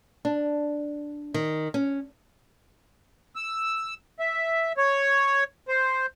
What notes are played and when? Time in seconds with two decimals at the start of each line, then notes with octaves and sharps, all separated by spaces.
0.25 D4
1.34 D#3
1.74 C#4
3.36 E6
4.19 E5
4.77 C#5
5.68 C5